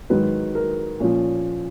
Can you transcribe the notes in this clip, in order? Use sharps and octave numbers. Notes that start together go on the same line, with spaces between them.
G#2 D#3 F#3 B4
A#4
A#2 F3 C#4